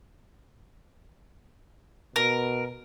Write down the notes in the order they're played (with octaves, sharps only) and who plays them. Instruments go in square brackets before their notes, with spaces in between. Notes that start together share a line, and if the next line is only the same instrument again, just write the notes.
[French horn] B2 [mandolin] A#4